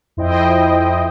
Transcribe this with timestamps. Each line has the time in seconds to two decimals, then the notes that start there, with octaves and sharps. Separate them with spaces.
0.17 F2 E4 C5 D#5 G5